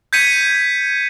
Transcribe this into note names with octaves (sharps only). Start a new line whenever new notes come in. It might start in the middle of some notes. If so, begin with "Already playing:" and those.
G6 G#6 B6 C#7 D#7